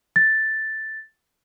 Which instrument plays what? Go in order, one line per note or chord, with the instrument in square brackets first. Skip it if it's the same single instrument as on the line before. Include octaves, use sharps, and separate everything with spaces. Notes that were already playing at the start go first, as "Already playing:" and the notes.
[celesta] A6